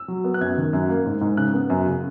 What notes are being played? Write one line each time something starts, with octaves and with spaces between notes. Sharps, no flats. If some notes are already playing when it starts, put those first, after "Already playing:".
Already playing: E6
F#3
B3
F#6
F#2 G#6
D#3
F#2
A#3
G#2
G#2
C#3 F#6
B3
F#2
C#3